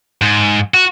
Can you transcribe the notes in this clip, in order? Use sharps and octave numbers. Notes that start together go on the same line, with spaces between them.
G#2
F#4